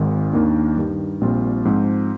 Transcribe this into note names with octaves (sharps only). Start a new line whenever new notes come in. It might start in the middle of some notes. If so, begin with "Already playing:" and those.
Already playing: G#1 G#2 D#3
D#2 D#3 A#3 D4
G2 D#3 G3
A#1 A#2 G3 C4 F4
G#2 F3 C4